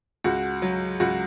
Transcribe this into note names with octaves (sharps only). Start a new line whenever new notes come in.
C#2 F#4
F#3
C#2 F#4